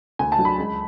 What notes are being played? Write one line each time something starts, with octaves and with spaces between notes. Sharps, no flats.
D2 G#5
A5
D3 F#3
B5
C#2